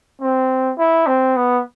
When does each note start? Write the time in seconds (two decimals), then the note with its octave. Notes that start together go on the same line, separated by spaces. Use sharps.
0.22 C4
0.78 E4
1.07 C4
1.36 B3